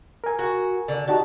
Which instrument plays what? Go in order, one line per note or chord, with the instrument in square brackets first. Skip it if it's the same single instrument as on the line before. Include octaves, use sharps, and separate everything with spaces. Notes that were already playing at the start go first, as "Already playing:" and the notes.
[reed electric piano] A#4 G#5
[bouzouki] F#4
D3
[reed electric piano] D#4 F#4 G4 [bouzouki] A5